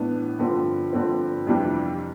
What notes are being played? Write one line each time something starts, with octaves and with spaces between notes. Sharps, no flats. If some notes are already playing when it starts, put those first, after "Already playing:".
Already playing: A2 E3 B3 D4
G2 D3 F3 C4
G2 D3 F3 C4
F2 C3 E3 G3 D4